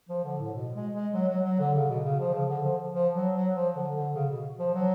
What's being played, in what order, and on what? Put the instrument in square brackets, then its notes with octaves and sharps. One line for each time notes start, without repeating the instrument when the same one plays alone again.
[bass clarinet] F3
D3
A2
B2
G#3
G#3
F#3
F#3
F#3
D3
C#3
B2
C#3
F3
C#3
D3
F3
F3
F#3
F#3
F3
D3
D3
C#3
B2
F3
F#3